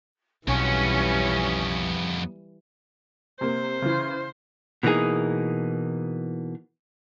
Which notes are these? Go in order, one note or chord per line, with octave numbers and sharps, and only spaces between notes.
B1 F2 E3 G3 B3 C#4
C3 A#3 C5
C#3 E3
B2 E3 A#3 D#4 G#4